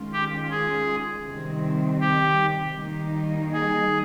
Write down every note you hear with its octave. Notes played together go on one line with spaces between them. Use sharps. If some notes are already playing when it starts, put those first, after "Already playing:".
Already playing: D#3 G#3 C#4 F4
G4
G#4
C3 D#3 G3 C4
G4
D#3 G3 A#3 D#4
G#4